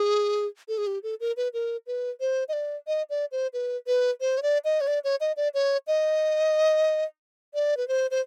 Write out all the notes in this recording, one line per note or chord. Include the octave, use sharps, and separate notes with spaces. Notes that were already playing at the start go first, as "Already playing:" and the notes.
Already playing: G#4
A4
G#4
G4
A4
A#4
B4
A#4
B4
C5
D#5
D5
D#5
D5
C5
B4
B4
C5
C#5
D5
D#5
C#5
D5
C#5
D#5
D5
C#5
D#5
D5
B4
C5
C5